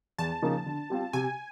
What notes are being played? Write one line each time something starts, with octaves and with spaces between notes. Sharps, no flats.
E2 A5
C#3 F3 A#3 D#4
D3
G3 C4 F4
C3 G#5